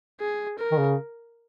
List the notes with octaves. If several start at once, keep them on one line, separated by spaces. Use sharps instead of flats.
G#4
A#4
D#3
C#3